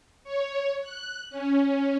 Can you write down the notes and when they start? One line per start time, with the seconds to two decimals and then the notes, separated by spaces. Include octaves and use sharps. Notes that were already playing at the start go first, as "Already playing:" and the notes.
0.24 C#5
0.81 F#6
1.30 C#4